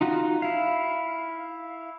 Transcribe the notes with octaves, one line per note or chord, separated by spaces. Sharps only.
D#4 F4 F#4
E4 F5